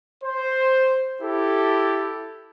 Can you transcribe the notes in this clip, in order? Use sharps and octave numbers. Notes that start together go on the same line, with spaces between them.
C5
E4 G4 A4